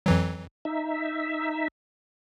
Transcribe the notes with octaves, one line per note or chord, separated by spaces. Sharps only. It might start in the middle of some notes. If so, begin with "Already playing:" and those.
F2 E3 F#3
D#4 E5